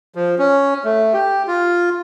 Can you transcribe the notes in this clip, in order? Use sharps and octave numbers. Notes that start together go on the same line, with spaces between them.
F3
C#4
A3
G4
F4